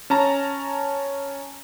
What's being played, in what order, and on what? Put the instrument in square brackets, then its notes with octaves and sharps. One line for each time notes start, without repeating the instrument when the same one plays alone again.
[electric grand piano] C#4 A5 A#5